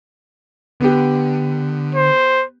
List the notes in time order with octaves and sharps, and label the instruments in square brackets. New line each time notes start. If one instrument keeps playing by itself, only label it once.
[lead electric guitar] D3 [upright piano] B3 G4
[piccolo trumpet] C5